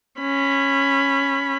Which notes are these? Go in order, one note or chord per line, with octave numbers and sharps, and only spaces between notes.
C#4 B5